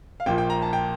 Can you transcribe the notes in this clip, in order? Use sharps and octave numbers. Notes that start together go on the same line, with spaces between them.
F5
A#1 A#2 F3 G5
G5
A#5
A5
G5